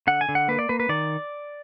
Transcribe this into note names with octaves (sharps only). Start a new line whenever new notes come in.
D3 F#5
G#5
D3
F#5
A#3 B4
D5
A#3 B4
B4
D#3 D5